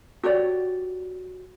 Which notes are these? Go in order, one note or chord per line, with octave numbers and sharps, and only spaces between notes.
F#4 G4 C#5 D5